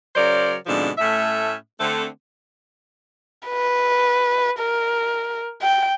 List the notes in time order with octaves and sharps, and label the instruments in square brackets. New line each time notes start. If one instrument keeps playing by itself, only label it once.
[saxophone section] C#3 F#3 A#4 C5 D5
G#2 B2 D3 F3 C4 D4
A2 A3 C#4 E5
D3 A3 C4
[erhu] B4
A#4
G5